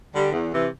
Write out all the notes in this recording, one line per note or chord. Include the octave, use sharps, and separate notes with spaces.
D3 G3
E2
C3 E3